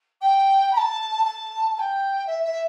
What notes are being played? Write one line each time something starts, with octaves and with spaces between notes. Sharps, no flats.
G5
B5
A5
A5
A5
G5
E5
E5